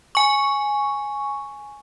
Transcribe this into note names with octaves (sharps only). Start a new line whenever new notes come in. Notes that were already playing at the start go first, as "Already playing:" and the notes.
G#5 C#6